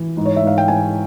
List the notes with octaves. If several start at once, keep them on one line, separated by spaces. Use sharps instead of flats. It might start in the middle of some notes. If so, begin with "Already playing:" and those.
Already playing: E3
G#2
C#5
E5
G#2 F5
G5
E3 G#5